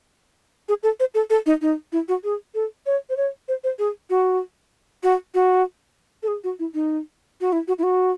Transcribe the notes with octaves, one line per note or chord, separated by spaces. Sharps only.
G#4
A4
C5
A4
A4
D#4
D#4
E4
F#4
G#4
A4
C#5
C5
C#5
C5
C5
G#4
F#4
F#4
F#4
A4
G#4
F#4
E4
D#4
F#4
E4
F#4
E4
F#4